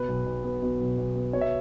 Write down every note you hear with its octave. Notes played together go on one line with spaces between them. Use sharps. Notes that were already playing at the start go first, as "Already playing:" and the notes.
Already playing: B2 B4
B1
B1
B3
B2
B1
B1
B3
B2 C#5
E5